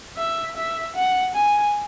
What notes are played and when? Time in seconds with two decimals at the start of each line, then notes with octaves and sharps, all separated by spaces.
0.17 E5
0.57 E5
0.96 F#5
1.35 G#5